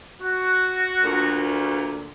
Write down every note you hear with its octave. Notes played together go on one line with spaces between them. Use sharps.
F#4
D2 A#2